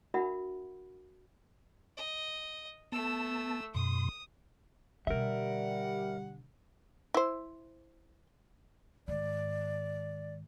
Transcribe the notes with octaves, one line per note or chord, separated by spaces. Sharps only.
D4 F#4 A#4 E5 F#5 B5
D#5
A3 B3 A5 E6
F#2 B2 C6 D#6
B2 D3 G3 A#4 E5 F#5
E4 C5
G#2 D#3 D5